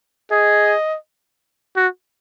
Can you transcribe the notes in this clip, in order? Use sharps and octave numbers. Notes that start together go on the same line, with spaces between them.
G#4 D#5
F#4